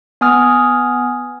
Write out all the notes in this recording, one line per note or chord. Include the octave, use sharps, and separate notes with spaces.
B3 G#5 D#6 F6